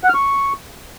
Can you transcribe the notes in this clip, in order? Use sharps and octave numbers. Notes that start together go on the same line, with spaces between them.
F#5
F6
C#6